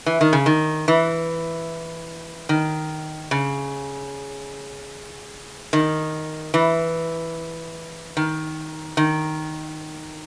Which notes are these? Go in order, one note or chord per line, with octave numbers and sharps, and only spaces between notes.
E3
D#3
C#3
D#3
E3
D#3
C#3
D#3
E3
D#3
D#3